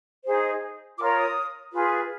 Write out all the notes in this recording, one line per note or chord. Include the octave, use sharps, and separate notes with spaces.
D#4 G#4 C5
F4 A#4 C#5 D6
D#6
F4 G#4 B4